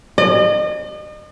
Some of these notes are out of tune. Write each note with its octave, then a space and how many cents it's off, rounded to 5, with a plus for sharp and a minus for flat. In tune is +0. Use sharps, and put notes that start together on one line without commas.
D#5 -40